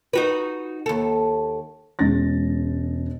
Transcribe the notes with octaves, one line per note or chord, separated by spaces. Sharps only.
D#4 F#4 B4
D#2 A4
E1 G#3 C#4 A6 A#6